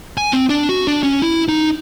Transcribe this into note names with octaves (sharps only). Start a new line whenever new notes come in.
G#5
C4
D4
F#4
D4
C#4
E4
D#4